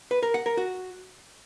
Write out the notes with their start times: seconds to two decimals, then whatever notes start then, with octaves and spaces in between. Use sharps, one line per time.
0.11 B4
0.23 A#4
0.34 F#5
0.46 A#4
0.57 F#4